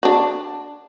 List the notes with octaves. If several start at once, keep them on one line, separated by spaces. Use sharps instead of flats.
D4 F#4